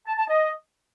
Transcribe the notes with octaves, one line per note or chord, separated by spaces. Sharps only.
A5
A5
D#5